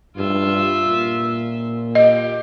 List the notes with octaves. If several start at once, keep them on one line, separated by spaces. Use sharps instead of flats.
G2 F4 E5
A#2
G4 D#5